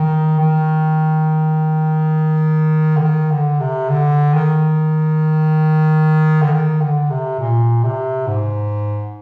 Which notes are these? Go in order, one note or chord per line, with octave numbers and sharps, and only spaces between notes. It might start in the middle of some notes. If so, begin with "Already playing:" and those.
Already playing: D#3
D#3
D3
D#3
D3
C3
D3
D#3
D3
D#3
D3
C3
A#2
C3
G#2